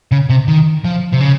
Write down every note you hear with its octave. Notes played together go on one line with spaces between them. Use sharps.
C#3
C3
D#3
F3
C3
C#3